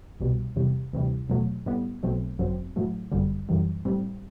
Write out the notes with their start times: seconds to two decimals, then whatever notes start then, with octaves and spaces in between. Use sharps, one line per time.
0.20 C2 B2 G3
0.56 E2 C3 G3
0.93 D2 C3 E3 G3
1.29 E2 B2 F#3 A3
1.66 A2 G3 B3
2.03 B1 B2 F#3 A3 C4
2.39 G1 F#2 F#3 C4
2.76 A2 F#3 A3
3.12 G1 F#2 D3 G3
3.49 F#2 E3 G3
3.85 A2 G3 C4